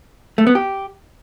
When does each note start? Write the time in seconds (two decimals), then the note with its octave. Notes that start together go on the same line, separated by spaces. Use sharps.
0.38 A3
0.47 B3
0.55 G4